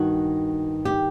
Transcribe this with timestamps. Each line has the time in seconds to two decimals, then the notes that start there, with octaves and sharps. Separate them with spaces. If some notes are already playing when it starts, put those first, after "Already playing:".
Already playing: G2 D#3 F#4
0.85 G4